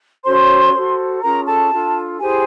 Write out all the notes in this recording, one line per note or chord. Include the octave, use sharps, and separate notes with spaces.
C#4 F#4 A4 C5 C#5 C6
F#4 A4 C5
C#4 F4 G#4 A#4 A#5
A4 A5
D4 F4 A4
E4 G4 G#4 C5 G#5